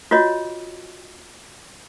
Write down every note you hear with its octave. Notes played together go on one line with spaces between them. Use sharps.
F4 F#4 C#5 D#5